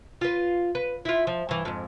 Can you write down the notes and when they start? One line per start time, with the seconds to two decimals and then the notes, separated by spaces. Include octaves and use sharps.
0.21 F4 B4
0.75 B4
1.05 E4 F4
1.27 F3
1.49 G2 E3
1.65 F2 G#2